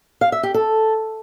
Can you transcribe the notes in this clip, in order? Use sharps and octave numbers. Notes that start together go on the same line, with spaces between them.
F5
E5
G4
A4